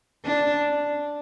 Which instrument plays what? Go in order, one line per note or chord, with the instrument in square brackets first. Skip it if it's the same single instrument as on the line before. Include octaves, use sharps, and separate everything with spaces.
[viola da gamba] D4